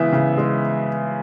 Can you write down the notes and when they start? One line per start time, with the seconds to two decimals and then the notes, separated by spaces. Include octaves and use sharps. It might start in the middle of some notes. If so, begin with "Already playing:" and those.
Already playing: C#3 E3 G#3 B3 E5
0.12 C#3
0.37 G#3